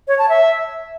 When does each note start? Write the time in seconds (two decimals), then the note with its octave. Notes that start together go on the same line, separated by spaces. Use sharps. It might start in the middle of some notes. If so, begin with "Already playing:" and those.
0.08 C#5
0.19 A5
0.29 E5